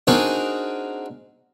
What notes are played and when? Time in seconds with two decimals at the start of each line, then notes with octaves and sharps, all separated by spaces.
0.07 C4 D4 D#4 F#4 G#4 A#4